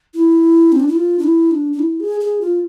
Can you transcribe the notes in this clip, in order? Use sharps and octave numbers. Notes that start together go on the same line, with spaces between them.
E4
C4
D4
E4
F4
D4
E4
D4
D4
E4
G#4
G#4
F4